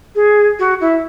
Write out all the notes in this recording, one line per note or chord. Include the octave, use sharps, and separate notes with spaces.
G#4
F#4
E4